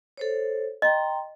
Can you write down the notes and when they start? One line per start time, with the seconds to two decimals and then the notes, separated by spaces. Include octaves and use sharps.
0.18 A4 C5 C#5
0.82 D#5 G5 A#5 C6